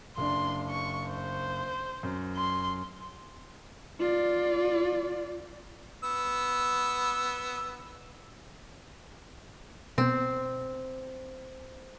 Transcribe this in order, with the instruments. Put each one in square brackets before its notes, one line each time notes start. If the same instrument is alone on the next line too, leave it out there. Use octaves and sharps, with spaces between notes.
[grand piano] F#1 D4 [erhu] C6
[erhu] C#6
C5
[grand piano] F#2
[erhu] C6
[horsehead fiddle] F4 D5
[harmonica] B3 E6
[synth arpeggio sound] B2 B3 [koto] C4